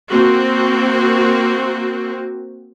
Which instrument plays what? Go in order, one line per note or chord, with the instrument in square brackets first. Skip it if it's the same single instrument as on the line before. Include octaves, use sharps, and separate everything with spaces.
[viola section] A#3 C4 F#4